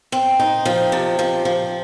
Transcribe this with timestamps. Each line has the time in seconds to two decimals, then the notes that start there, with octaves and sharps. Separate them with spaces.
0.12 C4
0.39 D#4
0.65 F3
0.92 C3
1.19 F3
1.45 F3